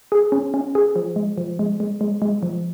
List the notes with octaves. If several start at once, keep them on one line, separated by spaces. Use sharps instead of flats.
G#4
C#4
C#4
G#4
F3
G#3
F3
G#3
G#3
G#3
G#3
F3